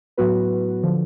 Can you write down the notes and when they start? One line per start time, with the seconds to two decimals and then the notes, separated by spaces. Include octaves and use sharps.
0.17 A2 F#3 B3 F#4 B4
0.83 D3 F3